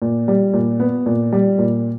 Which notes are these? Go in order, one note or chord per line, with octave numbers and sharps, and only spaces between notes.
A#2
G3
A#2
B3
A#2
G3
A#2